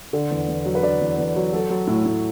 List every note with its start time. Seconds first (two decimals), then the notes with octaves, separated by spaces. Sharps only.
0.13 D3
0.31 E2
0.48 E2
0.66 F#3
0.75 B4
0.83 D3 D5
1.00 E2
1.18 E2
1.36 F#3
1.53 F#3 A4
1.70 F#3
1.87 A2
2.06 A2